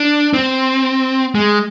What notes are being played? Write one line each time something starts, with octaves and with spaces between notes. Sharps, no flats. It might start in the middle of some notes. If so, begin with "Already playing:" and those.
Already playing: D4
C4
G#3